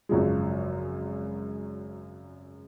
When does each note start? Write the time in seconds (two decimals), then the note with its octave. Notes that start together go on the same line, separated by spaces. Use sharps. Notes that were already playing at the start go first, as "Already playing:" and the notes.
0.09 G#1 F#2 C#3 F3 G#3